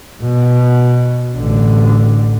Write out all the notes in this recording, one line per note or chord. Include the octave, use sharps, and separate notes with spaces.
B2
A1 D3